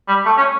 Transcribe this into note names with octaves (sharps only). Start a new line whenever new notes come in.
G3
A3
C#4